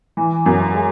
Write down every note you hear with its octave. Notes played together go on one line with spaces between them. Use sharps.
E3
F#2
G#3